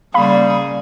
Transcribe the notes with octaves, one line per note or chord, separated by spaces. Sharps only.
C#3 G3 A#3 G#4 F5 B5